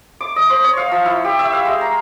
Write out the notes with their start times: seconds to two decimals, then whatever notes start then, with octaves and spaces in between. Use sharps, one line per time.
0.21 D6
0.36 D#5
0.50 C5
0.64 C#5
0.77 F5
0.92 F3
1.06 E4
1.24 G4
1.39 E5
1.52 F5
1.65 G#3
1.81 A#5